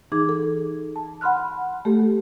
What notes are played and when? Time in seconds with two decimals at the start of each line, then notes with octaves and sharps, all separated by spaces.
0.12 E3 D#4 G#4 D6 G#6
0.29 A4
0.96 A5
1.21 F#5 B5 C6 F6 F#6
1.85 A3 G4 A4